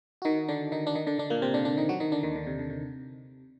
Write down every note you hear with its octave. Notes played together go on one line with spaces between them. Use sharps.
F#4
D#3 D#4
D3 D4
D#3 D#4
D4
D#3 D#4
D3 D4
D3 D4
A#2 A#3
C3 C4
D3 D4
D3 D4
D#3 D#4
F#3 F#4
D#3 D#4
D3 D4
D#2 D#3
D3
C3
D3
C3